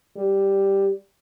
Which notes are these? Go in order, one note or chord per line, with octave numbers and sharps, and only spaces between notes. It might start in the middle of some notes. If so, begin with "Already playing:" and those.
G3